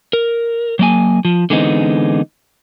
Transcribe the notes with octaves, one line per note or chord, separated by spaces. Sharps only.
A#4
F#3 A#3 G#5
F3
D3 E3 G#3 B3 C4 D#4